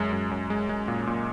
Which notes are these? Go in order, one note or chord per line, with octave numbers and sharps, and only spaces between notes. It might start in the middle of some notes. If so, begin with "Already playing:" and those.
Already playing: F#2 G#3
F#2
F#2
G#3
G#3
A#2
A#2